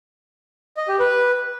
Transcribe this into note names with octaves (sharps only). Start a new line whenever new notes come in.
D#5
G4
B4